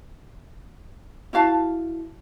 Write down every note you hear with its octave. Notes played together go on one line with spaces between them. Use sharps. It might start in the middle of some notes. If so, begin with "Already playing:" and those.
E4 F#4 F5 A5